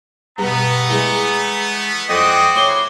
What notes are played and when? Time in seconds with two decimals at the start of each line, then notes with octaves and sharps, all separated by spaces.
0.38 G2 B2 A3 B3 A#5
0.89 E3 G#3
2.09 F2 F#4 G#4 C5 D5 D#5 G5
2.56 E4 C#5 C6 D6